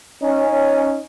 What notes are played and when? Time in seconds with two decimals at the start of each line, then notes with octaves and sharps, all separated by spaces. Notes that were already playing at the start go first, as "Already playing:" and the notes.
0.22 C#4 D#4